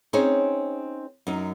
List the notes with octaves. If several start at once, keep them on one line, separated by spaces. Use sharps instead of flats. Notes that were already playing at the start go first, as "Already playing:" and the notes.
C4 C#4 D#4 G#4 C5 C#5
F#2 D#4